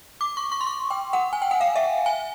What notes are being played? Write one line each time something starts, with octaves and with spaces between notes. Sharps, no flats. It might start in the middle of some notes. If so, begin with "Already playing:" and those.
D6
C#6
C#6
C6
C#6
G5
F#5
G#5
G5
F#5
F5
E5
G#5